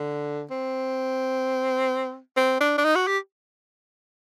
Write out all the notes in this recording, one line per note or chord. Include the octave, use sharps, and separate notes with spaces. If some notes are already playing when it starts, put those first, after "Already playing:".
Already playing: D3
C4
C4
D4
D4
D#4
F#4
G4